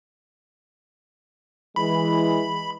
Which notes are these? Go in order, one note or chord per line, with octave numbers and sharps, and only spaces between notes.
E3 G#3 B5